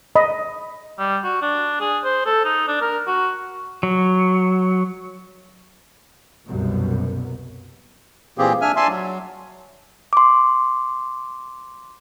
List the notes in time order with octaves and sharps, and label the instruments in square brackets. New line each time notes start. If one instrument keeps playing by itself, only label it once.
[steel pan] D#5 B5
[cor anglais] G3
F#4
D4
G#4
C5
A4
D#4
D4
A#4
F#4
[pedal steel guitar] F#3
[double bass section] C2 F#2 B2 B3
[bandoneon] A#2 E3 A#3 C4 G4 G#4
D4 E5 G#5 F6
D5 E5 G#5 A5 C6
F#3
[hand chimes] C6 D6